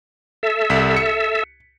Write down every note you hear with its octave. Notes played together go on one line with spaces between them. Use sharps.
A4 E5
C2 B6
C#7